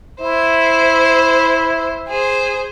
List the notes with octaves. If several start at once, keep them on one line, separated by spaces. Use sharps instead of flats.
E4 C5
G#4 C5